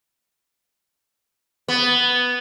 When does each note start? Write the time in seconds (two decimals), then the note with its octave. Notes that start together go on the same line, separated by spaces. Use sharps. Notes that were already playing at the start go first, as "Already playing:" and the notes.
1.68 B3